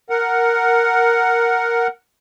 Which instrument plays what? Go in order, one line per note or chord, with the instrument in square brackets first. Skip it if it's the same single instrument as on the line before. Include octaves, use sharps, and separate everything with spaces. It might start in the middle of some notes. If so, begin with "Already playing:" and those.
[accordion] A#4 F#5